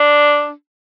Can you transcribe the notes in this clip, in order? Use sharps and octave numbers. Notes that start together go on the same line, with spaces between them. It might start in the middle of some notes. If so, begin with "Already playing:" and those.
Already playing: D4